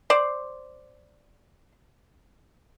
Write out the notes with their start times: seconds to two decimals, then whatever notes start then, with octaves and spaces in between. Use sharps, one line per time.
0.10 C5 D5